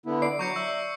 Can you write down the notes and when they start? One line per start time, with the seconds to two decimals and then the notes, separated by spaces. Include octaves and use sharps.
0.06 D3 B3 E4
0.22 D5 C7
0.39 F#3 A#5 C#6 G6 C#7
0.56 E5 E6